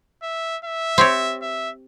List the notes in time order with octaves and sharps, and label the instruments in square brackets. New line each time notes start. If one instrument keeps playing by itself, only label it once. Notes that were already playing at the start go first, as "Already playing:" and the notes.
[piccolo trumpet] E5
E5
[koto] C4 G4 C#5
[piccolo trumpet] E5